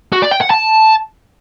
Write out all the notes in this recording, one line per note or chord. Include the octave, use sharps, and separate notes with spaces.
F#4
D5
G5
F#5
A5